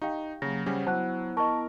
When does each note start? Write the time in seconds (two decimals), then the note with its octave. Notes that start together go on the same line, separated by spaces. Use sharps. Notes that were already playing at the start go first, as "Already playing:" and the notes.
0.02 D#4 G4 F5 G5
0.42 C#3 F#3 A#3 A#6
0.66 C#3 G3 C#4 C5 F#5
0.87 F#3 B3 E4 C5 F#5 A5 F#6
1.37 B3 E4 A#4 D#5 A5 C#6